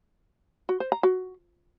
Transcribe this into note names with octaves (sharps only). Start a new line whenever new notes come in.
F#4
C5
A#5
F#4